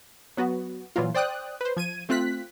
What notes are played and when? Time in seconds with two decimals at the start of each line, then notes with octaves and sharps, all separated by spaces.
0.37 F#3 B3 F#4
0.96 A#2 E3 F#3 A#3 F4
1.14 C5 D5 G5 D#6 F#6
1.61 B4 C5
1.77 F3 G#6 D#7
2.09 A3 C4 F4 F#6 B6